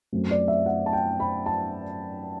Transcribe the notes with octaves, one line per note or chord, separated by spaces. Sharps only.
F#2 F#3 A3 C4
D5
E5
F#5
A5
G5
B5
A5